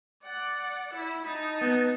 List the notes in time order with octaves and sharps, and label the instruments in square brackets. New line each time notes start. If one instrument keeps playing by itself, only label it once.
[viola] D5 F#5
E4
D#4 A5
[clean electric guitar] B3